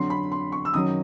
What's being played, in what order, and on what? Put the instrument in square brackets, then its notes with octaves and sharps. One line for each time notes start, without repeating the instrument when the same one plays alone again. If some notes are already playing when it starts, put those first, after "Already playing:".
Already playing: [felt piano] F2 D3 F#3 C6
B5
C6
C#6
E6
F#2 D#3 F#3 D#6